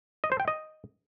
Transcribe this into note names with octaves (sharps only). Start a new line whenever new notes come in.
D#5
C5
G5
D#5